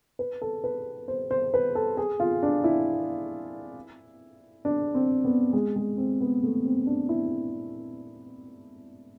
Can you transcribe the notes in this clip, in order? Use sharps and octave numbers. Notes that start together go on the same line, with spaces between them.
B4
A4
B4
C5
C5
B4
A4
G#4
F4
D4
E4
D4
C4
B3
G#3
G#3
C4
B3
A3
C4
D4
E4